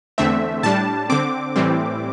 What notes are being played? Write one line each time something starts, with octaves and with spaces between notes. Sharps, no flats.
E2 D3 A3 C4 E5
A2 G3 D4 A5
D3 C4 D6
A2 E3 G3 C4